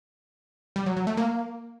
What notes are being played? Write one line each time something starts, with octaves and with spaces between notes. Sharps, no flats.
G3
F#3
F#3
A3
A#3